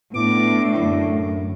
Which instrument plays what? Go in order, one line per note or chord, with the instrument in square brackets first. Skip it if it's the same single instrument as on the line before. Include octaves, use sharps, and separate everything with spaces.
[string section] A2 [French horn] B3 [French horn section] D4 E4 [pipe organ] D6
[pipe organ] F#2 [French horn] D3